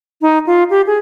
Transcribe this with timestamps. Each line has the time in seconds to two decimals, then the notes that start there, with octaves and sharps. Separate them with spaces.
0.22 D#4
0.47 F4
0.70 G4
0.87 G#4